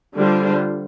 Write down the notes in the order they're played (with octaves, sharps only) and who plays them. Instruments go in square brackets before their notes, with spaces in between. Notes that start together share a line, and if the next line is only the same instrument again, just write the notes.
[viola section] D3 G3 D4 F4 C5